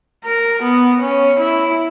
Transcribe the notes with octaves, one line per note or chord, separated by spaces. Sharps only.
A#4
B3
C#4
E4